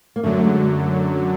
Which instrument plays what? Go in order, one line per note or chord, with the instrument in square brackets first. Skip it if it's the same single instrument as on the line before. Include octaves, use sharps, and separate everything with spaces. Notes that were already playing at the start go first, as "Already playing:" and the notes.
[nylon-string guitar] A#3
[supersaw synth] F#2 D3 F#3 [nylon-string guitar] A3
[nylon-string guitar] G#3